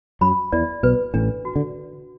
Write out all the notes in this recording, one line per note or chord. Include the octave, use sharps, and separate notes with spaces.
F#2 F#3 B5
E2 E3 D5
B1 B2 B4
A1 A2 D4
F#4
D3